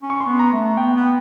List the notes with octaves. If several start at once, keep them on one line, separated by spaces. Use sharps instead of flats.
C#4
C#6
C6
B3
A#5
A3
B3 G5
B3